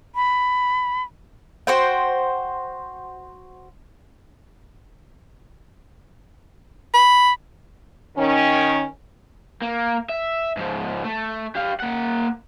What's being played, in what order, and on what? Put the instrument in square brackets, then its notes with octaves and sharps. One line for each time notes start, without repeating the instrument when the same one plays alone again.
[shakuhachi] B5
[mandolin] F#4 C5 G5
[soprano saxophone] B5
[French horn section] D#3 C#4
[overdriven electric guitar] A#3
E5
G#2 F3
A3
G4 F5
A#3 F#5